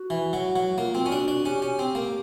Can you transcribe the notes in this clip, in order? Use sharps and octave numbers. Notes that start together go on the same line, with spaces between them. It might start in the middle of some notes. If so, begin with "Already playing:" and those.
Already playing: F#4
E3
F#3
F#3
A#3 F4
C4
C#4
D4 F#4
D4
C#4 G4
C#4
C4
A#3